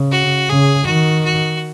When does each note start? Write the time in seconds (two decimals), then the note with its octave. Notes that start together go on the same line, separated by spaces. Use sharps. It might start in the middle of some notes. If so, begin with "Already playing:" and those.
Already playing: C#3
0.12 F#4
0.49 C#3 G#4
0.86 D#3 F#4
1.25 F#4